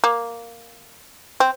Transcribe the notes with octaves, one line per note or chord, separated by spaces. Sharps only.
A#3
C4